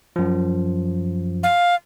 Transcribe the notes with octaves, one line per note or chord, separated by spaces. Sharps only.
F#2 F3
F5